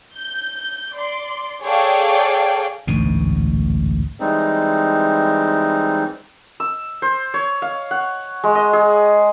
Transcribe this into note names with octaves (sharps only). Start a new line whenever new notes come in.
G6
D5 C6
G#4 A4 C#5 D5 F5 G5
A1 D2 G#2 B2
E3 G3 G#3 C4 D#4
E6
C5
C#5
F5
F#5
G#3
D#5
G#4